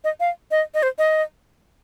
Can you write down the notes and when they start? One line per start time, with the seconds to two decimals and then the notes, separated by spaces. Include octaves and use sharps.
0.04 D#5
0.20 F5
0.51 D#5
0.74 D#5
0.83 C5
0.98 D#5